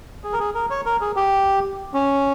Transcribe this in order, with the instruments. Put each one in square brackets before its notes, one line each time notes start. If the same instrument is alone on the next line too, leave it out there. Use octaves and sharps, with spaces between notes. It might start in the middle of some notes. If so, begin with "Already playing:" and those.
[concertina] G#4
A#4
G#4
A#4
C#5
A#4
G#4
G4
C#4